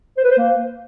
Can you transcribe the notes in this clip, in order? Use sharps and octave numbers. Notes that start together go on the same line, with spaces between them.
C5
B4
C5
A#3